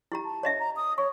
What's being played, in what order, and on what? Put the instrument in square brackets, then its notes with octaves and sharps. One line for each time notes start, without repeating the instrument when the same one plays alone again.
[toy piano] E4 G4 A#5
[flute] A5
[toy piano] C#5 D#5 E5
[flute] A#5
D#6
[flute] C#5 [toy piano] C#6